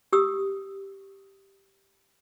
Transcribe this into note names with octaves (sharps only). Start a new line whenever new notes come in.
G4 D#6 E6